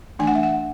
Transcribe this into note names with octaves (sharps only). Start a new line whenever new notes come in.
E3 A3 D4 G#5
F#5
E5
F#5